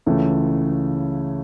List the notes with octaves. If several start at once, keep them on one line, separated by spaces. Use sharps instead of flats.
C#2 C#3 E3 A3